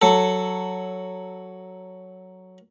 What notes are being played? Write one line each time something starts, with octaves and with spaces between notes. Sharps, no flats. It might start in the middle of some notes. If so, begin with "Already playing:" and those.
F#3 A4